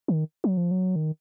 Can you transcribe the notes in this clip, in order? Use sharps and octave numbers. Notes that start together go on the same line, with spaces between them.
D#3
F#3
F3
F#3
D#3